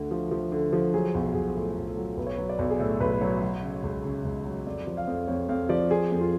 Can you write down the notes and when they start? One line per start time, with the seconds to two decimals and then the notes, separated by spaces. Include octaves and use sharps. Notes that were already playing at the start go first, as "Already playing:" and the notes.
Already playing: D2 D3 F#4
0.11 F3
0.31 F3
0.52 D3
0.73 F3
0.94 F#3 G#4
1.14 B1 F#4
1.25 F#4
1.34 B1 G#4
1.55 A2 A4
1.77 B1
1.87 A4
1.97 F#3
2.17 B1 B4
2.27 C#5
2.35 F#3 B4
2.49 D5
2.59 B1
2.70 G#4
2.79 A2 A4
3.00 B1 B4
3.21 F#3 C#5
3.41 F#3
3.63 C#3
3.83 C#2
4.04 C#3
4.25 C#2
4.46 F#3
4.66 F2 D5
4.87 F3
4.97 F5
5.07 F2
5.28 F2 C#5
5.49 F2 F5
5.69 F3 D5
5.90 F3 G#4
6.12 F2
6.21 F4